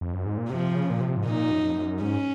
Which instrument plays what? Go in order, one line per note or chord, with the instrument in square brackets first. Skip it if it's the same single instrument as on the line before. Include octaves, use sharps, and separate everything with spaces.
[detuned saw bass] F2
F#2
G#2
A#2
[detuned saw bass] C3 [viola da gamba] F3
[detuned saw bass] C#3
A#2
C3
G#2
[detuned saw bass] A#2 [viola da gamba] D#4
[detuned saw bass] F#2
F2
F#2
[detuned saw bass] G#2 [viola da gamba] C#4